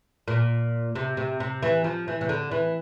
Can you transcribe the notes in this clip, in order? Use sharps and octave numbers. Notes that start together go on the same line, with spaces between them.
A#2
C3
C3
C3
E3
F3
E3
C3
D3
E3